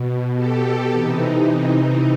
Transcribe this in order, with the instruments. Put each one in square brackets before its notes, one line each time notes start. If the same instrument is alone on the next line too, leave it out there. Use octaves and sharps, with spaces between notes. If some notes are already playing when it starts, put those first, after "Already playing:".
Already playing: [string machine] B2
G4 A4
C3 E3 D#4